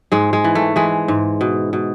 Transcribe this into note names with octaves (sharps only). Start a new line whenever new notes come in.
G#2 G#3
G#3
E3
A3
E3 G#3
G#2
B2
B2